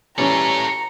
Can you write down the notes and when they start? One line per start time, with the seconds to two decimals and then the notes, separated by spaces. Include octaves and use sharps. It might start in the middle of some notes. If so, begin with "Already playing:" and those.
0.18 E3 G3 C#4 A4 C#5 A#5